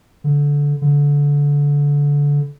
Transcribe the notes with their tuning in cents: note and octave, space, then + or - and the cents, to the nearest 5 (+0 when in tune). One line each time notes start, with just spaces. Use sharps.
D3 -20
D3 -25